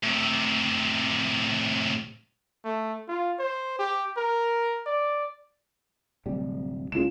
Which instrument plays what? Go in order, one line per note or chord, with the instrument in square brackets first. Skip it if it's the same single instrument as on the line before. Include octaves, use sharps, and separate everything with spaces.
[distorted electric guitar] A2 C3
[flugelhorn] A3
F4
C5
G4
A#4
D5
[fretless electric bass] D1 C3 G3
[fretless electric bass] C#2 C#3 [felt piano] F4 E7